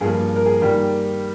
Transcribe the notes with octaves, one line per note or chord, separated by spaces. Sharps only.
G2 F3 A#3 G#4
A#4
G#4
D#3 G3 A#3